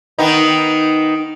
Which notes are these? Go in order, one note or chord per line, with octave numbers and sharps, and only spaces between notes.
D#3 B3 D#4